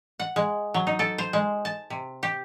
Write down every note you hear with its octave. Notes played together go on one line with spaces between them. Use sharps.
F#5
G#3
F#3
D#4
A4
C5
G#3
A5
C3
G4